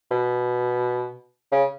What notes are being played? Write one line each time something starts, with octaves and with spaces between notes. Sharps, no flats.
B2
C#3